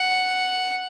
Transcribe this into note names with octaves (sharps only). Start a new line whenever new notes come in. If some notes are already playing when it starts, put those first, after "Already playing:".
Already playing: F#5